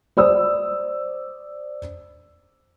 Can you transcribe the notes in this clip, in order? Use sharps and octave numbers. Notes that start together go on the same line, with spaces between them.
C5 D5 D#6 E6